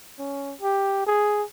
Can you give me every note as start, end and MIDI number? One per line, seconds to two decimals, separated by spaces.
0.19 0.55 61
0.61 1.06 67
1.07 1.44 68